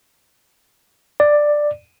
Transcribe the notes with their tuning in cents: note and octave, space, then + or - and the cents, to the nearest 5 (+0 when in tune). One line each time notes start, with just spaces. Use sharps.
D5 +10